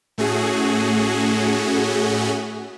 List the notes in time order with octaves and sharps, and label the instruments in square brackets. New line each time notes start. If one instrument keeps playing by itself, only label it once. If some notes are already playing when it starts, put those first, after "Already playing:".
[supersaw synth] A2 A3 C#4 F#4 G#4